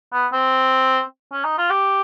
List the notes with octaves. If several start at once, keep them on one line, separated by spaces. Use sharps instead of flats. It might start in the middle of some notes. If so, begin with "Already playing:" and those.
B3
C4
C#4
D#4
F4
G4